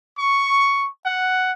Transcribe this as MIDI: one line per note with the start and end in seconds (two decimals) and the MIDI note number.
0.19 0.88 85
1.06 1.53 78